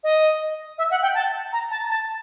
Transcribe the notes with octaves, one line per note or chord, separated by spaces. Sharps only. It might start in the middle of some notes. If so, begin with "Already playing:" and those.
D#5
E5
F#5
G5
A5
A#5
A5
A5